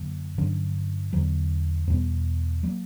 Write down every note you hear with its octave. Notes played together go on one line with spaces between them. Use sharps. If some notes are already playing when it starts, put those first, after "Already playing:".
Already playing: F#2 D3 F#3 A#3
G2 D3 F#3 C#4
E2 D3 F#3
E2 B2 G3 B3
F#3 A#3